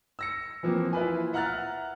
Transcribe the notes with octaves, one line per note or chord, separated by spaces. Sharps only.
E6 A#6 C#7
E3 F3 A#3 C4
E4 F4 B4 G#5
E5 F#5 A#5 F6 F#6 A6